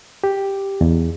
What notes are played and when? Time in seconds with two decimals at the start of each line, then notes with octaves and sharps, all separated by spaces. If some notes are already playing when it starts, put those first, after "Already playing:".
0.24 G4
0.81 E2